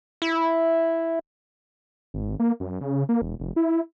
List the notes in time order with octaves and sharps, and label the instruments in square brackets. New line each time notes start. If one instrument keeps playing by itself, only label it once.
[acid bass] E4
[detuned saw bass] G#1
A#3
F#2
C#3
A#3
E1
F1
E4